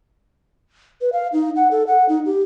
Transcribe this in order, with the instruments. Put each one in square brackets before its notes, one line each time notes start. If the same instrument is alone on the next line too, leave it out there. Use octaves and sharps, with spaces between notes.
[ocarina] B4
F5
D#4
F#5
A4
F#5
D#4
G4